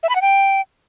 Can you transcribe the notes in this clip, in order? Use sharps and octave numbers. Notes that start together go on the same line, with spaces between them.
E5
B5
F#5
G5